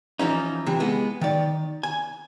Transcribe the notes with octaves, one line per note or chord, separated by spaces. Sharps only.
E3 F3 C#4 D#4
C3 E3
G#3 B3
D#3 D5
G#5